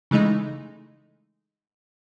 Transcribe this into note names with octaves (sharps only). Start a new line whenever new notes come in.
C#3 E3 G#3 A3 D#4